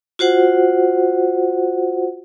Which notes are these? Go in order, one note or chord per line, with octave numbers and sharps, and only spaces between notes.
F4 F#4 C5 F#5